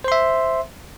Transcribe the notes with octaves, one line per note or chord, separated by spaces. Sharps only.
C5 E5 C6